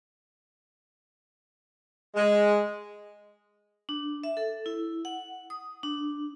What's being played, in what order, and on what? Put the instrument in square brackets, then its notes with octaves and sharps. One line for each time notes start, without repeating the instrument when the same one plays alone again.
[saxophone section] G#3
[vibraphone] D4
E5
A4
E4
F#5
D#6
D4